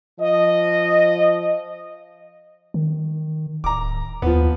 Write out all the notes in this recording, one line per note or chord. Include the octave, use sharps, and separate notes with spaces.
F3 D#5
D#3
D1 A#5 D6
D#2 F3 B3